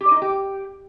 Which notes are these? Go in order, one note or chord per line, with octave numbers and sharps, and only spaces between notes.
G4
D5
D#4
D#5
G4